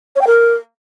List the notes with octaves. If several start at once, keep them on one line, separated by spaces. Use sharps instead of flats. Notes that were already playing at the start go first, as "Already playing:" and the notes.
C#5
G5
A#4